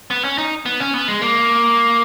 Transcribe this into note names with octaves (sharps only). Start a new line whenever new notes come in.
B3
C#4
D#4
B3
C#4
B3
G#3
A#3